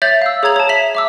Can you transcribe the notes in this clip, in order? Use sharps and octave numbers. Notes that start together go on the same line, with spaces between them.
C#5 E5 G6 A6 F7 F#7
F5 E6
G#4 C#5 A#5 G#6 F7 F#7
C#5 A5
E5 B6 F7 F#7
E5 D6 E6